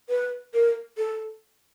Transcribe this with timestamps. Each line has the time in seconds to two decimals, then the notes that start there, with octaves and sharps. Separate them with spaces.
0.09 B4
0.54 A#4
0.98 A4